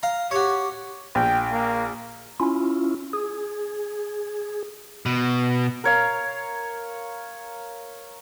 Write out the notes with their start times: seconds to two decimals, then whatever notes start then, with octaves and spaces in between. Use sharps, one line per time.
0.03 F5 A#5
0.31 F#4 G4 C#5
1.15 A#1 G5
1.52 A#3
2.40 C#4 E4 F4
3.13 G#4
5.06 B2
5.84 A#4 C#5 F5